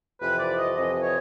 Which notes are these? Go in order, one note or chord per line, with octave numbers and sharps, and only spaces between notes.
F2 C3 E3 B4
D5
D#5
F2 C3 E3 D#5
C#5